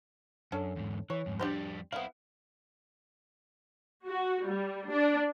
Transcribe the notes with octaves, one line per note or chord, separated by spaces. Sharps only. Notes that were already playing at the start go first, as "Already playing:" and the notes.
F#2 C#4 D4 A4
E2 G#2
E3 C#5
F2 G#2
F2 G3 D4 G4 C5
B3 C4 E4 F5
F#4
G3
D4